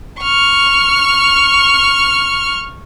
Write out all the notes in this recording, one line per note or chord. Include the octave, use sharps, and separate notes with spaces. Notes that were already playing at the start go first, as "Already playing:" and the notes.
C#6 F6